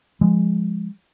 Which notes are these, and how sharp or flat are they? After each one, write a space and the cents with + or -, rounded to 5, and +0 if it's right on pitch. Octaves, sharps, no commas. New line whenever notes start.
F3 +0 G#3 -10